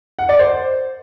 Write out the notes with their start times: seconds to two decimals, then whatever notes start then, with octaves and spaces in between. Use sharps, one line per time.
0.19 F#5
0.29 D5
0.39 C5